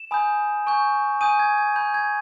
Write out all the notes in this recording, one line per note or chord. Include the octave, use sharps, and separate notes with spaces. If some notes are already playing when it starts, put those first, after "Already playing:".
Already playing: E7
G#5 B5 D#6 G6
G#5 C#6 G6
G#5 D#6 G6 D#7
G#6
G#6
B5 G6
G#6